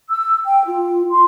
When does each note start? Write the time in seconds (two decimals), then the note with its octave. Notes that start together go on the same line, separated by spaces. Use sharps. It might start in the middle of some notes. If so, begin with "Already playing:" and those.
0.09 E6
0.44 G5
0.66 F4
1.10 C6